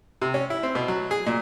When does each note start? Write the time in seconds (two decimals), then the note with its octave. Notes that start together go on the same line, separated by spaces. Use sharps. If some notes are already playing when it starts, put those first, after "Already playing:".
0.22 C3
0.34 C#4
0.50 E4
0.63 C4
0.75 B2
0.88 F#3
1.11 G#4
1.27 A#2